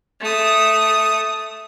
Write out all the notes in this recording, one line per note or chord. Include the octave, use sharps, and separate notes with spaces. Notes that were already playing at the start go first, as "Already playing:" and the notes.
A3 D#6